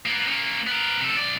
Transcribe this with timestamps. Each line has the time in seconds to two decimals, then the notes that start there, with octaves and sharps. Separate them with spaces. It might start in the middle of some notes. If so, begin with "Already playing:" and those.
0.06 A#3 B3
0.28 A#3 C#4
0.67 B3 A#4
1.00 C3 A4
1.17 B1 D5